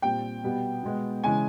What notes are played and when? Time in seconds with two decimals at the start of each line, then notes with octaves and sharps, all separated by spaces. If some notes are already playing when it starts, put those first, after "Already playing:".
0.02 A#2 G3 C4 G5
0.44 B2 G3 B3
0.83 B2 G#3 B3
1.24 C#3 E3 G#3 G#5